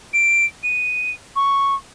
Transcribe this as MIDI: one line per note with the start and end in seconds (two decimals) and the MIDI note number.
0.14 0.45 98
0.63 1.11 99
1.36 1.75 85